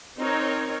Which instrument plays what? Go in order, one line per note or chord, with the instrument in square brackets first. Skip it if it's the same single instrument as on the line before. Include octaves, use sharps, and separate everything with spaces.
[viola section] C4 D#4 A#4 C#5